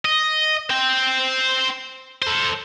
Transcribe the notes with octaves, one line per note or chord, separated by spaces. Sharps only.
D#5
C5 G5
A4 C5